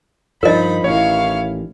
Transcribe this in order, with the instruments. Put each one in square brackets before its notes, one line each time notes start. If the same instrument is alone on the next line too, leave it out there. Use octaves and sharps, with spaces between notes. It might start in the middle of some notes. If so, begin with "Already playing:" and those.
[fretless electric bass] G2 F3 [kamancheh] D#4 B5 [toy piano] A#4 D#5
[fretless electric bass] A1 D#3 [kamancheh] E4 F5 [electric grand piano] C#5